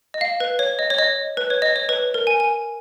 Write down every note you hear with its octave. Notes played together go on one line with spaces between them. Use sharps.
D#5
F5
B4
C#5
D#5
C#5
D#5
B4
C#5
D#5
C#5
B4
A#4
G#5
G#5